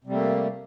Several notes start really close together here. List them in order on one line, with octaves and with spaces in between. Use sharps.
C3 G3 A3 A#3